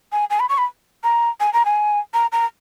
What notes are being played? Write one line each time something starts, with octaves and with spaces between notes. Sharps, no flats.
G#5
G#5
B5
C#6
B5
A#5
G#5
A#5
G#5
A#5
A#5